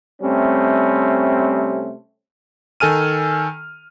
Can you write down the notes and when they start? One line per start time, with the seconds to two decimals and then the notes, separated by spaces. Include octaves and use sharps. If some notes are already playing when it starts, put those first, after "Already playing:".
0.22 C3 G3 A3 C4 C#4
2.80 D#3 A4 G#5 F6 D#7